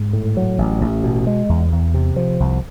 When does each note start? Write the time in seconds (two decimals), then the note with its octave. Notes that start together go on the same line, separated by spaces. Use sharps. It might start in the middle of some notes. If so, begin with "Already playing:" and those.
Already playing: G#2
0.13 A2
0.37 F#3
0.58 A1
0.81 A1
1.04 B2
1.27 G#3
1.49 E2
1.72 E2
1.94 C3
2.16 F3
2.40 C2